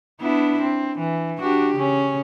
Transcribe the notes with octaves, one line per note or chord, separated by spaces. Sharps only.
B3 D4 E4
C4
E3
D4 F#4 G4
C#3 C#4